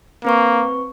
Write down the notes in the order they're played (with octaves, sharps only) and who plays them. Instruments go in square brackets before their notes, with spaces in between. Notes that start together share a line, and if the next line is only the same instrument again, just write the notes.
[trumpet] A#3 [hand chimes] C4 B4 C#6